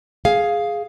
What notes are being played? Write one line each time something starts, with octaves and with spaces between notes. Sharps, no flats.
G#4 F5